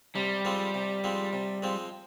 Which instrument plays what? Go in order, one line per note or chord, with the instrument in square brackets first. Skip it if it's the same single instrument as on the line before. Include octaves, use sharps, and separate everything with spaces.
[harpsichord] C3 [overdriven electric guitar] G3
[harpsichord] F3 G#3 C4
C3
F3 G#3 C4
C3
F3 G#3 C4